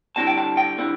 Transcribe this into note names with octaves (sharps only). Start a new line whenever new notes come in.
D3 G3 C4 E4 A5
G5
A5
G5
D3 G3 C4 E4